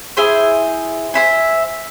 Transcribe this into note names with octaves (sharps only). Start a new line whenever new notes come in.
E4 G#4 C5
C5 E5 G#5